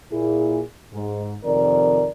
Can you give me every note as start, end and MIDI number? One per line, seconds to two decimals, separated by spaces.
0.12 0.61 46
0.12 0.61 64
0.12 0.61 68
0.93 1.34 44
1.45 2.08 41
1.45 2.08 48
1.45 2.08 51
1.45 2.08 70
1.45 2.08 74